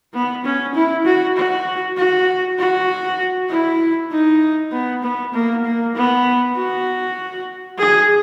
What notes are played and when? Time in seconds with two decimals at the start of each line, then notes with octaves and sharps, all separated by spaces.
0.14 B3
0.45 C#4
0.74 E4
1.05 F#4
1.36 F#4
1.97 F#4
2.59 F#4
3.50 E4
4.11 D#4
4.72 B3
5.03 B3
5.34 A#3
5.65 A#3
5.95 B3
6.56 F#4
7.78 G#4